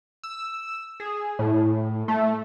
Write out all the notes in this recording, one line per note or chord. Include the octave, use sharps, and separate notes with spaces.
E6
G#4
A2
A3